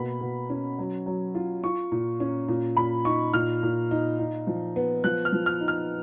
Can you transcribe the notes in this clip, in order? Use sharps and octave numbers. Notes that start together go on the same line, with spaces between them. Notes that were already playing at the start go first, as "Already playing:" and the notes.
Already playing: B2 A#3 B5
B2
C#4
F#3
F#3
F4
F4 C#6
A#2
C#4
A#2
A#2 B5
D#4 C#6
A#2 F6
A#2
D#4
D#4
F3
B3
F3 F#6
F6
F3
F6
D#4
F6